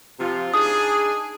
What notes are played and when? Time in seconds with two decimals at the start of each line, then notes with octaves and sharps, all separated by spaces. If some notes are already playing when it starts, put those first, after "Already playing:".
0.20 C3 F3 F4
0.54 D4 D#4 G#4 D#6